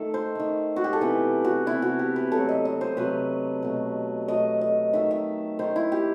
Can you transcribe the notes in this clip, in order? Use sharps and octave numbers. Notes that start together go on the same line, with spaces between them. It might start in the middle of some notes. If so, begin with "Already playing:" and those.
Already playing: D#3 A3 A4
C5
D#3 A3
F#4
G4
A4
C3 E3 B3 B4
F#4
C3 E3 B3 E4
F#4
G4
B4
C3 F#3 A3 A4
D#5
D#5
C5
C3 F#3 A3 B4
B2 A3
B2 A3 D#5
D#5
D#3 A3 E5
E5
D#3 A3 C5
E4
G4